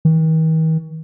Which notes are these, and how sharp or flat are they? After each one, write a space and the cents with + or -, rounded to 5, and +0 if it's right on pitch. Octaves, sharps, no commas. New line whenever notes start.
D#3 +45